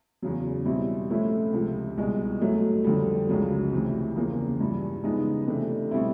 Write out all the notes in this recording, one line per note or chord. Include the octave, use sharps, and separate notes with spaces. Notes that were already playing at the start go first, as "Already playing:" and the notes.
E2 C#3 F#3
B2 G3 C4 E4
A2 F3 A3 C#4 E4
C#2 C3 F3
C2 B2 G#3
A2 F#3 A3
F2 D3 G3
C#2 C#3 F#3
D2 C3 E3
E2 C#3 F3 A#3
G2 E3 G3
C#3 F3 G#3 B3 D#4
C3 E3 A3 D4
B2 G3 C4 E4